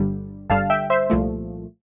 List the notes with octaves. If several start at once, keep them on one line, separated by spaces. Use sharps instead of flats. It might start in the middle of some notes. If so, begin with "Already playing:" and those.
Already playing: G1 G2 D3 G3
G1 G2 D3 G3 F5 A5
E5 G5
C5 E5
C2 A#2 F3 A3